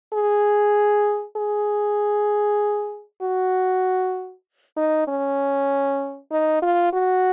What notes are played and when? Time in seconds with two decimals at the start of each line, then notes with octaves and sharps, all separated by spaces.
0.13 G#4
1.36 G#4
3.22 F#4
4.77 D#4
5.08 C#4
6.32 D#4
6.62 F4
6.93 F#4